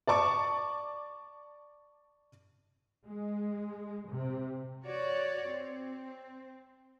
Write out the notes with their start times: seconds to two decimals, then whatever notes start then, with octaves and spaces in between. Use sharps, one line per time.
0.07 D5 A5 C#6 D6
3.06 G#3
4.08 C3
4.85 F#4 C#5 D5
5.51 C4